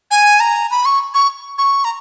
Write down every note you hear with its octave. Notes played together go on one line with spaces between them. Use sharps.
G#5
A#5
B5
C#6
C#6
C#6
A#5